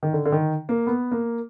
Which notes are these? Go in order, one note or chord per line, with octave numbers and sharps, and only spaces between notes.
D#3
D3
D3
D#3
A#3
B3
A#3